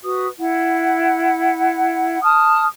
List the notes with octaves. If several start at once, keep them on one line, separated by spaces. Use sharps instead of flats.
F#4 B4 D#6
E4 F#5
A5 D#6 F6